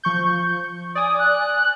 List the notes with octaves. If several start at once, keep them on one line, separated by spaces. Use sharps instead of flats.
F3 C#6 G6
D5 G#5 D#6
F#6